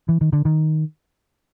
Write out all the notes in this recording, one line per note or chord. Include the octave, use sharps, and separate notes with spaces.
E3
D#3
D3
D#3